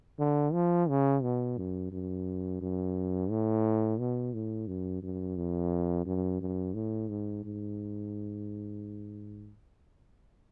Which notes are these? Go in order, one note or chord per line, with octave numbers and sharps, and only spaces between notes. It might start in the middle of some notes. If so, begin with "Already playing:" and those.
D3
F3
C#3
B2
F#2
F#2
F#2
A2
B2
A2
F#2
F#2
F2
F#2
F#2
A2
G#2
G#2